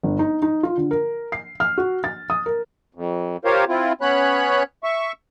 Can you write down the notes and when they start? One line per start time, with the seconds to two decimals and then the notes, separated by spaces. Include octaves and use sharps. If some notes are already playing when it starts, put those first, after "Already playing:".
0.03 G1
0.19 D#4
0.42 D#4
0.63 F4
0.77 D3
0.91 A#4
1.32 C7
1.60 F6
1.78 F#4
2.04 A6
2.30 D#6
2.46 A#4
2.95 F2
3.45 F4 G4 A#4 C5 C#5 F5
3.69 C4 E4 F4
4.01 B3 C#4 C#5 B5 F#6
4.84 E5 C#6